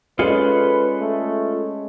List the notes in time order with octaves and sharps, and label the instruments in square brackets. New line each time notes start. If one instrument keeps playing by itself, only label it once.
[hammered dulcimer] G#3 C#4 D5 [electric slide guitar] F4 G#4 A4 [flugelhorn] B4
[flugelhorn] A3